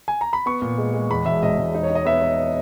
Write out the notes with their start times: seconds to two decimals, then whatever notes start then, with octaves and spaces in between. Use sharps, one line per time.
0.08 G#5
0.21 A#5
0.33 B5
0.46 B3 C#6
0.62 A#2
0.78 G#3
0.94 G#3
1.10 E2 B5
1.26 E1 E5
1.43 E1 D#5
1.58 E1
1.75 D#4
1.83 C#5
1.90 D#4
1.95 D#5
2.05 B3 E5
2.21 B3